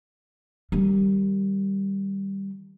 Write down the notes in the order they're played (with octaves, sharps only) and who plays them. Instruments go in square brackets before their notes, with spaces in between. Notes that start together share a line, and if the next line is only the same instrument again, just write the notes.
[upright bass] D#3 G3